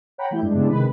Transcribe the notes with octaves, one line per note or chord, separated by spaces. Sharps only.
C#5 F#5 G5 A#5 B5
E3 A3 E4 G4 G6
G2 G#3 D4
C#3 G3 G#3 B3 D4 E4
C3 D#3 G#3 B4